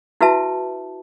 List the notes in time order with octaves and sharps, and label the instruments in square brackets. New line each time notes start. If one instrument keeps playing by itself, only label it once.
[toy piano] E4 F#4 B4 E5 A5